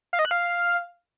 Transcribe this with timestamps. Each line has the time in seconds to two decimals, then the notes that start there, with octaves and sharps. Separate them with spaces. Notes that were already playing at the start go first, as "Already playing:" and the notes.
0.13 F5
0.19 D#5
0.25 F#6
0.31 F5